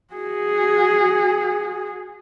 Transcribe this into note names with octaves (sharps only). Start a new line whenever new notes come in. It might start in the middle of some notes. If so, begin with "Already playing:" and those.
F#4 G#4